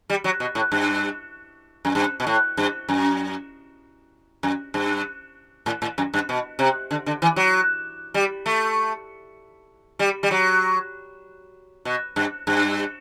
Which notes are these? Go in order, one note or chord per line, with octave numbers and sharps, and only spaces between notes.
G3
F#3
B2
A2
G2
F#2
G2
B2
A2
G2
F#2
F#2
G2
A2
A2
F#2
G2
B2
C3
D3
D3
E3
F#3
G3
A3
G3
G3
F#3
B2
G2
G2